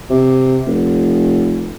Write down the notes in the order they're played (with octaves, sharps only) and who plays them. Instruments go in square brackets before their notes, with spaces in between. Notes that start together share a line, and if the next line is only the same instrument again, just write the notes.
[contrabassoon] C3
F1